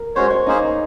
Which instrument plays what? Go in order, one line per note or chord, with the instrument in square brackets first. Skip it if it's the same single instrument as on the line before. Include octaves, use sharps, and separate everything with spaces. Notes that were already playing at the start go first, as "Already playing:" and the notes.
Already playing: [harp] A#4
[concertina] G#3 C#4 F#4 C#5 [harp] C5
[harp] C#5
[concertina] A#3 C#4 G#4 C5 [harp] D#4